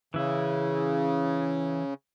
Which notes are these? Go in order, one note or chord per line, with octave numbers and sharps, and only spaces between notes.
C#3 E3 E4